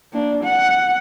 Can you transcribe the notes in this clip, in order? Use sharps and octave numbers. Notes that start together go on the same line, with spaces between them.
A#3 D4
F#5